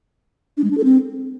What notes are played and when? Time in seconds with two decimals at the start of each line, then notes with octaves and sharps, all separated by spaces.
0.57 D4
0.64 G#3
0.71 D4
0.77 A4
0.84 C4